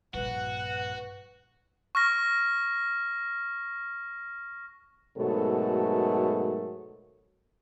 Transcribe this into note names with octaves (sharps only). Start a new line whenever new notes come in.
A#1 G2 F#4 B4 F#5
C#6 F6 A#6
G#2 B2 F#3 A3 A4 A#4